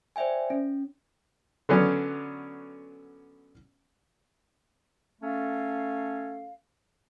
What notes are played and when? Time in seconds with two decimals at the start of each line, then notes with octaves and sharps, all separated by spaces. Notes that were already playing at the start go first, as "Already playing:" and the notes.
0.16 C5 D5 E5 G5 G#5
0.50 C#4
1.69 D3 F#3 B3 C#4
5.22 A3 C#4 A4 F5